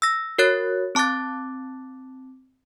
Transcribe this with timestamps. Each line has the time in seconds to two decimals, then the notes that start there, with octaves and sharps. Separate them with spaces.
0.02 E6 A#6
0.38 F#4 A#4 C#5 F#6 A6
0.95 C4 A5 D6 F#6 A6